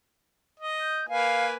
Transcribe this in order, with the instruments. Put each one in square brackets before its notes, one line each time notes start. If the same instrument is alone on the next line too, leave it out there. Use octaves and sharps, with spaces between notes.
[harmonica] D#5
[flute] G6
[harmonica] A#3 B4 G#5 [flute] F5